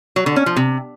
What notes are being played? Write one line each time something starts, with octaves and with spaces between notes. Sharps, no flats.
F#3
D3
C#4
F3
C3